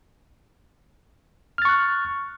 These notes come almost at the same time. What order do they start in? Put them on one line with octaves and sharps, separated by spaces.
F6 A6 C#6 F#6